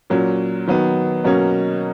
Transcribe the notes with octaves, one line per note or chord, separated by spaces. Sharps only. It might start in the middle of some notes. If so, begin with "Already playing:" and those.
A#2 F#3 C#4
D#3 F#3 B3
B2 F#3 A#3 C#4